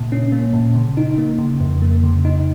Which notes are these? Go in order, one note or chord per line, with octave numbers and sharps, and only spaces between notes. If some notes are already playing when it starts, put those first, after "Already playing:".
Already playing: A#2 C#3
C#4
A#3
A#2
C#3
D#4
A#3
C#3
F2
A#3
C#3
D#4